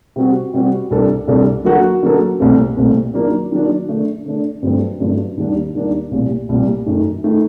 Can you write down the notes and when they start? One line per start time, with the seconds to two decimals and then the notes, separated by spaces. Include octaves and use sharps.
0.16 C3 G3 C4 F#4
0.54 C3 G3 C4 F#4
0.90 C2 C3 G3 D4 A4
1.27 C2 C3 G3 D4 A4
1.65 D3 F#3 A#3 F#4 A4
2.03 D3 F#3 A#3 F#4 A4
2.39 C2 A#2 A3 C4
2.76 C2 A#2 A3 C4
3.14 D#3 F#3 A#3 D4
3.52 D#3 F#3 A#3 D4
3.89 D3 A3 D4
4.26 D3 A3 D4
4.62 G2 D3 F#3 A3 C4
5.00 G2 D3 F#3 A3 C4
5.37 D#2 D#3 G3 A#3 D4
5.75 D#2 D#3 G3 A#3 D4
6.11 C2 A#2 G3
6.49 C2 A#2 G3
6.86 F#2 D#3 A3
7.24 D#3 A3